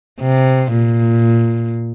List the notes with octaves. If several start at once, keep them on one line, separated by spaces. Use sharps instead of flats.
C3
A#2